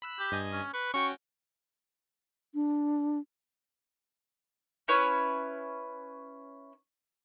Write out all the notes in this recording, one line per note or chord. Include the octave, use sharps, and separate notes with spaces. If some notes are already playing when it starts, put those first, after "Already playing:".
B5 E6 F#6
G4
G2 D#5 G#5
C#4
B4 C#6
C#4 F#4 G5 C#6
D4
C#4 E4 B4 C#5